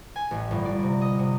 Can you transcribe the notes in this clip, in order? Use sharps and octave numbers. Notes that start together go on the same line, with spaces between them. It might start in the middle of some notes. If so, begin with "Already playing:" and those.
G#5
A1
G1
D5
C3
D#5
C3